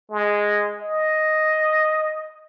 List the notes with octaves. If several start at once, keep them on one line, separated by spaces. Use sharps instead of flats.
G#3
D#5